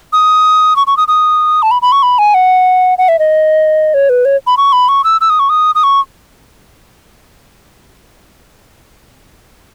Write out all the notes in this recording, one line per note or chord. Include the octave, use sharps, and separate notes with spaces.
D#6
C#6
C#6
D#6
D#6
A5
B5
B5
C#6
B5
G#5
F#5
F#5
E5
D#5
C#5
B4
C#5
B5
C#6
B5
C#6
E6
E6
D#6
C#6
D#6
D#6
C#6